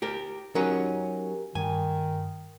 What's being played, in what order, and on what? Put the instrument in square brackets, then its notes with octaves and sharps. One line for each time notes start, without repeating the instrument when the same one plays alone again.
[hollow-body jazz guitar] G4 A#4
[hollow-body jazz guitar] F#3 C#4 D#4 [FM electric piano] G4 A#4
[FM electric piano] G2 [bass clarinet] D#3 [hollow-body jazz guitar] G#5